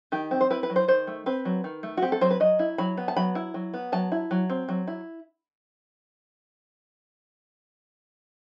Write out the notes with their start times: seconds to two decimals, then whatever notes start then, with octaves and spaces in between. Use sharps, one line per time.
0.12 D#3 G4
0.31 C4
0.41 C5
0.50 E4 B4
0.63 B4
0.70 F#3
0.76 C5
0.88 D#3 C5
1.07 A3
1.26 C4 B4
1.45 F#3
1.64 D#3
1.83 A3
1.97 F#4
2.02 C4 G4
2.12 A4
2.21 F#3 C5
2.31 B4
2.40 F#3 D#5
2.59 E4
2.78 F#3 B5
2.97 B3
3.08 A5
3.16 F#3 B5
3.35 E4
3.54 F#3
3.74 B3
3.92 F#3 A5
4.12 E4
4.31 F#3
4.50 C4
4.69 F#3
4.88 E4